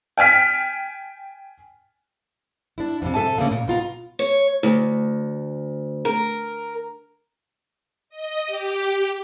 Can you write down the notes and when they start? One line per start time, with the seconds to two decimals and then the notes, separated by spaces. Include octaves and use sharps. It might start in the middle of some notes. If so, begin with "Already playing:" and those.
0.18 G5 G#5 F6 B6
2.78 D4 E4
3.02 F2 C3
3.14 C3 A4 E5 G#5 A5
3.38 C#3 A3 A#3 C#4
3.51 A#2
3.67 B2 F4 A#5
4.19 C#5
4.63 D2
6.05 A#4
8.09 D#5
8.47 G4